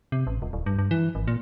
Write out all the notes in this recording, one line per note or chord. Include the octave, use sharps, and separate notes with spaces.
C3
A1
D#1
D1
G2
G2
E3
G#1
A#2